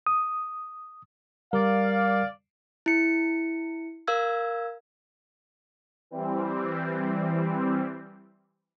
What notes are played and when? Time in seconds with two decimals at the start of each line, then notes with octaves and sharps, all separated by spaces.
0.07 D#6
1.53 G3 A#4 D5 F5
2.86 E4 C#7
4.07 A#4 F5 E6 G#6
6.11 E3 G3 C4